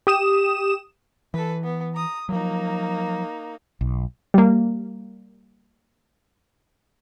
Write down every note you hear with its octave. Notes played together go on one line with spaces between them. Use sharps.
G4 D#6 E7
E3 A4 B4
B3
A#5 D#6
F3 F#3 A#3 D#4
B1
G3 A#3